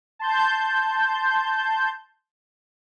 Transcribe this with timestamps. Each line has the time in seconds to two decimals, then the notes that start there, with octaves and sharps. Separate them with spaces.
0.19 A5 C6 G6